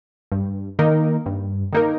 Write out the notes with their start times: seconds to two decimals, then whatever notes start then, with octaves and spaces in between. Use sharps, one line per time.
0.32 G2
0.79 D#3 A#3 D#4 A#4
1.26 G2
1.73 D#3 A#3 D#4 A#4